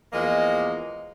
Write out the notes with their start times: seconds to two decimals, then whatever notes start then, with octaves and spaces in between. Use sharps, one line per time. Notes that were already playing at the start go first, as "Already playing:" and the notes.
0.13 E2 F3 G#3 A#3 D#5